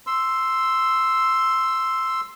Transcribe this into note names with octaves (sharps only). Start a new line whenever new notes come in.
C6 E6